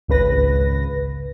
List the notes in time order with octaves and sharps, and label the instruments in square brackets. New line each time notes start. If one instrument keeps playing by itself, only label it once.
[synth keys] G#1 C#2 C#3 B4 A#6